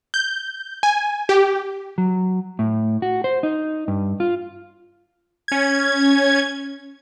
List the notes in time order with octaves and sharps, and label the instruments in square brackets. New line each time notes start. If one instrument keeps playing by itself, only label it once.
[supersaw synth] G6
G#5
G4
[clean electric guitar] F#3
A2
F#4
C5
D#4
G2
F4
[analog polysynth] C#4 G#6